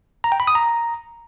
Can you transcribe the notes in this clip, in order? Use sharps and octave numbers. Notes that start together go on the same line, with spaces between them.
A#5
G5
B5
D#6
A#5